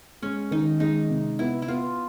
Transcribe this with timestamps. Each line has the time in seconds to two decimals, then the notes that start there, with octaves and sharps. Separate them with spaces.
0.22 G#3 C#4
0.51 D#3 D#4
0.80 G#3 D#4
1.10 C3
1.39 B3 E4
1.62 E4
1.68 B3 F4